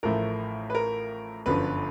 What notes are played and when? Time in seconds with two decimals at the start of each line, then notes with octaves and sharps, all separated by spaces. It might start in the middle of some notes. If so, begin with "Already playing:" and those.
0.03 A1 A2 F3 A3 A#4
0.70 B4
0.75 A#4
1.46 G1 F#2 D3 F3 B4